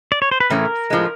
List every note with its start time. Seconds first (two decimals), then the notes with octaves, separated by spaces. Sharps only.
0.12 D5
0.22 C#5
0.31 C5
0.40 B4
0.50 A2 E3 A3 C#4 A#4
0.90 A2 F3 G#3